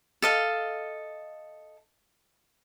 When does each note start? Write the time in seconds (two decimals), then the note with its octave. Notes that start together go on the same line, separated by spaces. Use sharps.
0.22 A4 D#5 F5